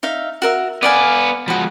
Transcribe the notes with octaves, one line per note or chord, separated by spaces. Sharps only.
D#4 E5 F5
F#4 A#4 E5
B3 D5 F5 F#5 G#5
F3 G#3 F#4 B5